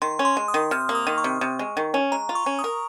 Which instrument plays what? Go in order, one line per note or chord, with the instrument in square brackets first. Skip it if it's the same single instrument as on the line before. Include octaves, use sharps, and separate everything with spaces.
[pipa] D#3 [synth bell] C6
[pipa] C#4
[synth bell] C6
[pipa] G#3
[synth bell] D#6
[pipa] D#3
[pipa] C3 [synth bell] F6
[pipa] A#3
[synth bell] D#6
[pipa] D#3
[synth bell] C#6
[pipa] C3
C3
G#3
D#3
C#4
[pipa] G#3 [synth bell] A#5
[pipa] F4
[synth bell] C#6
[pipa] C#4
[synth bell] D#6
[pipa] A#4